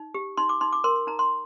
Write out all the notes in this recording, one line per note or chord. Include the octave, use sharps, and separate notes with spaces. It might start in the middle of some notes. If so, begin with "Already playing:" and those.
Already playing: D#4
G4
D#4 C6
D6
D#4 C6
D6
A#4 C6
C6
D#4 A#5
C6